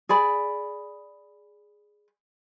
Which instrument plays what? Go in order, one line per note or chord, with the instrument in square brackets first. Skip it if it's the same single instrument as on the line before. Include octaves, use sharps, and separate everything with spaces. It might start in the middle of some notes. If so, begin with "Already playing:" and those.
[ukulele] G#4 D5 B5